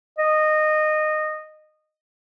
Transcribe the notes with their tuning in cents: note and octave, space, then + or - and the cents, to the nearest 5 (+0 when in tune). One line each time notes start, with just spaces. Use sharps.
D#5 -15